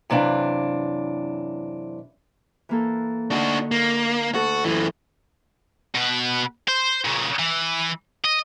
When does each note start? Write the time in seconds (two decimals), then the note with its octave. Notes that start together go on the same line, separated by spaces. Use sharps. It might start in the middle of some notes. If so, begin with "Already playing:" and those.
0.10 F#2 C3 E3 D4 F5
2.69 E3 A#3 A4
3.31 D3 D4 D#4 F#4 C#6
3.71 A#3
4.34 D2 F#4 A4
4.65 F#2 E3
5.95 B2 B4
6.68 C5
7.05 A#2 C#3
7.39 E3
8.25 D#5